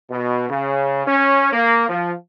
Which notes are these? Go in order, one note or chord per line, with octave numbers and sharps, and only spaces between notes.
B2
C#3
C#4
A#3
F3